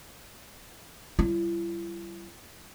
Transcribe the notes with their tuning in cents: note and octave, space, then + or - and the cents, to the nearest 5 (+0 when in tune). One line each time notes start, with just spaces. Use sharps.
G3 -30 E4 +45